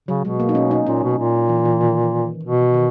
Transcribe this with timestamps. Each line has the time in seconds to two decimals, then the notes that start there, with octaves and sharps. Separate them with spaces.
0.08 C#3 F#3
0.24 B2 G#3
0.40 A#3
0.49 D#4
0.55 C#4
0.71 D#4
0.86 A#2 C#4
1.03 B2
1.18 A#2
1.49 E3
1.65 E3
1.81 D#3
2.43 B2
2.74 D#3